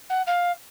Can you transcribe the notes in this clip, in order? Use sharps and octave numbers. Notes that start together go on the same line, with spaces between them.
F#5
F5